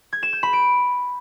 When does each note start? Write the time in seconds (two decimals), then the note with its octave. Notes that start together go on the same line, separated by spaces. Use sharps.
0.13 G#6
0.23 E7
0.33 G6
0.43 B5
0.53 D7